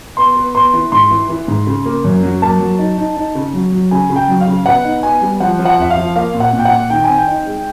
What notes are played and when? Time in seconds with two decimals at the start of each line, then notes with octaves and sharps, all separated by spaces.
0.17 B3 C6
0.36 B3
0.55 B3 C6
0.73 E3
0.92 G#2 C6
1.11 E3
1.29 E3
1.48 G#2
1.67 C#3
1.85 A#3
2.04 F#2
2.23 F#3
2.42 A#3 A5
2.60 F#3
2.79 D#4
2.98 D#4
3.17 D#4
3.35 C#3
3.54 F#3
3.72 F#3
3.91 C#3 G#5
4.10 C#3
4.16 G5
4.29 F#3
4.41 F5
4.47 C#3
4.66 B3 F#5
4.84 D#4
5.03 B3 G#5
5.22 G3
5.40 F3 F#5
5.59 F3
5.65 F#5
5.78 F2 E5
5.90 F5
5.97 F3
6.16 A#3 F5
6.34 A#2
6.40 F#5
6.53 A#2
6.59 G5
6.65 F#5
6.71 A#2
6.90 D#3 G5
7.04 C4 G#5
7.18 G5
7.28 D#4
7.46 G#3